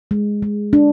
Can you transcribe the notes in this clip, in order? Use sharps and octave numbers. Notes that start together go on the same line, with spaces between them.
G#3
G#3
D4